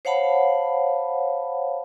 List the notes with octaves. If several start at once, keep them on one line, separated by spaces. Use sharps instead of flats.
C5 C#5 F5 F#5 A5 B5